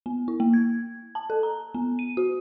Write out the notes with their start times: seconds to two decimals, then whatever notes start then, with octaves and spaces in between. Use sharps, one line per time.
0.06 B3
0.28 E4
0.40 A#3
0.54 G#6
1.15 A5
1.30 A4
1.43 A#5
1.74 B3
1.99 D#7
2.17 F#4